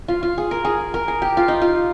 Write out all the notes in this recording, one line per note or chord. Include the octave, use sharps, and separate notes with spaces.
F4
F4
G#4
A#4
G#4
A#4
G#4
G4
F4
D#4
F4